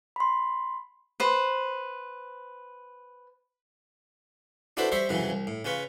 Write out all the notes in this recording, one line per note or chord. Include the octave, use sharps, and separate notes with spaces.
B5 C6
B4 C5
D4 E4 F#4 A4 B4 C5
G3 C5 E5 C#6
C2 F2 C#3 E3 F#3
C2
A2
C#3 F4 B4 C#6